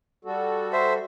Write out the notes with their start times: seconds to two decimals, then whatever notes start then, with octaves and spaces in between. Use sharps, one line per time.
0.25 G3 F#4 A4
0.73 C5 E5